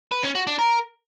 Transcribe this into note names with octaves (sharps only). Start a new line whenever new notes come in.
B4
C#4
F#4
D4
A#4